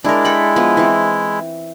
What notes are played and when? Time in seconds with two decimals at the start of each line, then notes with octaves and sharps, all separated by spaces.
0.04 G#3 D4 E4 A#4
0.25 A4 G5 B5
0.56 F3 B3
0.77 E3 C4